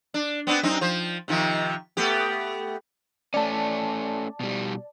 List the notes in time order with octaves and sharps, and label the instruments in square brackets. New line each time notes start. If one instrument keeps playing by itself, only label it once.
[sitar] D4
B3 C4 D4
F#2 C4 D#4
F3 C5
C3 D#3 F3
A3 B3 G4
[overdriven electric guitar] A3 C#4 [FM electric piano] D5 A5
[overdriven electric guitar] B2 G3